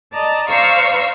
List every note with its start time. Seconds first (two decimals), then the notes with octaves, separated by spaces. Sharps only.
0.13 D5 D#5 A5 A#5
0.49 C5 D5 F5 A#5 C#6 E6